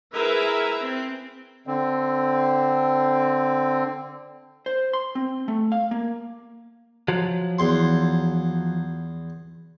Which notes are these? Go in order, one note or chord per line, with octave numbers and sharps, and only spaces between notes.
E4 G#4 A#4 B4 E5
C4
D3 C4
C5
C6
C4
A3
F5
A#3
F3 F#3
E2 C6